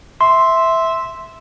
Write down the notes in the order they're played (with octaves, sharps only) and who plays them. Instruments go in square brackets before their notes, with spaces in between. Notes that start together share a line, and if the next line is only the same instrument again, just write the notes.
[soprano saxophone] E5 [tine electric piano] C6